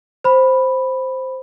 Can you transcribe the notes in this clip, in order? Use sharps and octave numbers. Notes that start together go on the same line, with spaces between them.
C5 B5